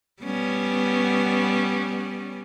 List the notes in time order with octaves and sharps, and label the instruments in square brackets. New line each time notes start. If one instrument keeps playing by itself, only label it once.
[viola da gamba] G3 B3 C#4